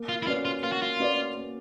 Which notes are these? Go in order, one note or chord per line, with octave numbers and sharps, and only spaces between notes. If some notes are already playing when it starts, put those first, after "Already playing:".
Already playing: A#3
F4
E4
C#4 F4 F#4 B4 D5
F4
A#3 F4
F#4
F4
C#4 F#4 B4 D5
A#3